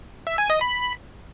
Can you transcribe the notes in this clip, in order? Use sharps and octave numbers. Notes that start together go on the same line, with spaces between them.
E5
G#5
D#5
B5